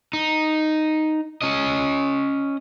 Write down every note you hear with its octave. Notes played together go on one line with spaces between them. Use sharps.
D#4
C#4 D#5